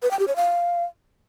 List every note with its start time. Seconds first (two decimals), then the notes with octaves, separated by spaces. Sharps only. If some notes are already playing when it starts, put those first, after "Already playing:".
0.03 B4
0.11 G5
0.19 G4
0.28 C#5
0.36 F5